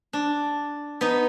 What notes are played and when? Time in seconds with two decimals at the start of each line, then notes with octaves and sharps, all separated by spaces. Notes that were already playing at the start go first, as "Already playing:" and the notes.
0.13 D4
1.01 B3 D#4